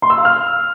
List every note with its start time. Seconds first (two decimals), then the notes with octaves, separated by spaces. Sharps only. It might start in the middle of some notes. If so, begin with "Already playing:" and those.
0.02 C6
0.10 E6
0.17 F5
0.25 F6